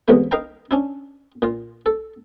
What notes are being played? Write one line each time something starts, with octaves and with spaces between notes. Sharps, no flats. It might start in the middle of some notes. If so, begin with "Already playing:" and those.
B1 E2 G#2 C3 A3 B4
D#4 A#4 B4 F5 G5 A#5
C#4 D4 E4
A#2 F4
A4